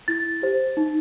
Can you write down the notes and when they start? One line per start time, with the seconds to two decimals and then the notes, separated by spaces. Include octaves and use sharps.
0.08 E4 A6
0.42 G4 C5
0.77 D#4